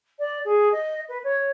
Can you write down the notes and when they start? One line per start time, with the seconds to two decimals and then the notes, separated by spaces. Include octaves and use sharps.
0.19 D5
0.45 G#4
0.72 D#5
1.09 B4
1.24 C#5